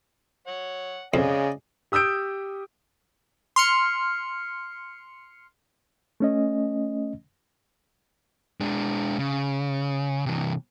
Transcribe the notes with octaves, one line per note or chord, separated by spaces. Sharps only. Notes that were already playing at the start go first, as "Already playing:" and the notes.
C#5 F#5
F2 C#3 D5 D#5 G#5
G4 D#6 E6 G6 D7
C6 F6 C#7
A3 C#4 D#5
G#3 D4
C#3
C3 E3